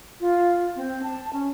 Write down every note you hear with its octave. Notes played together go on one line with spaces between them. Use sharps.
F4
C4
A5
C#4